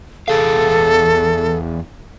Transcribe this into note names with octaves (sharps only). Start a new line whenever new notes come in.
E2 G#4 A4 F5